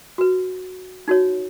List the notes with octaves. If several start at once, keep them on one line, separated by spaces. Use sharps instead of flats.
F#4 B4
D#4 F#4 C#5